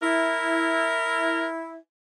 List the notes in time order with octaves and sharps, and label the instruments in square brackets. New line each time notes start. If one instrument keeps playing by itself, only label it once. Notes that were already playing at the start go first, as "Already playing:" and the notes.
[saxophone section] E4 [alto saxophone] A#4